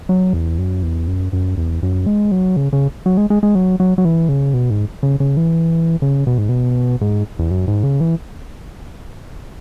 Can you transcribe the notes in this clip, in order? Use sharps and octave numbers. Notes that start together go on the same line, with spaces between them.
F#3
E2
F#2
E2
F#2
F#2
E2
F#2
G#3
F#3
C#3
C#3
F#3
G#3
G#3
G#3
F#3
F#3
F#3
E3
C#3
B2
G#2
C#3
C#3
E3
C#3
B2
G#2
B2
G#2
E2
F#2
G#2
C#3
E3